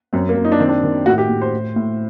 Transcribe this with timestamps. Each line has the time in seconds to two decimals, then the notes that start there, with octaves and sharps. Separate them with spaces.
0.13 F#2 C4
0.29 A#3
0.36 F#2
0.45 D#4
0.52 D4
0.60 D#3 C4
0.69 D4
0.84 D#3
1.06 A2 F#4
1.18 G4
1.29 A2
1.42 C5
1.53 A2
1.76 A2